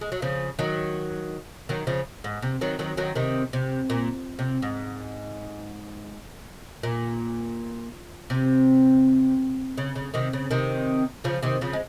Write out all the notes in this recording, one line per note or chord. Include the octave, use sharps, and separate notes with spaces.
G#3
F#3
C#3 F3
D#3 F#3
D#3 F#3
C#3 F3
G#2
C3
D#3 F#3
D#3 F#3
D#3 F#3
C3 D#3
C3
A#2
C3
G#2
A#2
C3
C#3
C#3
C3 D#3
C#3
C3 D#3
C#3 F3
C3 D#3
C#3 F3
G#3